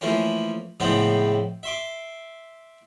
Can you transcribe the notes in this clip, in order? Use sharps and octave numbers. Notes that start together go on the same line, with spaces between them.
E3 F3 A3 A#3 C#4
A2 C#3 F3 G#3 B3 C4
E5 C6 D6